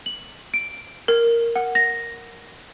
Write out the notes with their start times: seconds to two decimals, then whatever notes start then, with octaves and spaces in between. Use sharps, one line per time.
0.06 F#7
0.54 D7
1.08 A#4
1.56 F#5
1.75 A#6